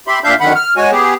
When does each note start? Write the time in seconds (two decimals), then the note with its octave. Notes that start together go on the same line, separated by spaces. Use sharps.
0.07 G4 E5 B5 C6
0.24 A#2 D4 E5 F5 G6
0.41 F#2 D3 D#3 F#5 B5
0.56 F6
0.77 G#3 F#4 C#5 G#5
0.91 B3 G4 G#4